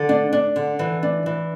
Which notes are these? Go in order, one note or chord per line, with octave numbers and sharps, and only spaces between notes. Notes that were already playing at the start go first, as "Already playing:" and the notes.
Already playing: D3
D4
D4
D3
E3
D4
E3